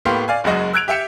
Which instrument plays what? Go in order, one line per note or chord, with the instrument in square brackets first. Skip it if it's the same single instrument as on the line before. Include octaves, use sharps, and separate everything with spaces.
[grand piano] A2 A#3 B3 G4 F5 C6
D5 F5 G#5
F#1 F#2 G#3 F#4 D#5
E6 F#6 G#6 D7 F7
G4 E5 G5 C#7 E7